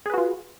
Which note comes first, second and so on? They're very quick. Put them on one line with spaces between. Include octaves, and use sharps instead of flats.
G#4 B4 F#4 F4